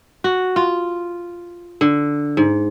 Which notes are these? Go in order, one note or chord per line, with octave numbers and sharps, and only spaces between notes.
F#4
F4
D3
G#2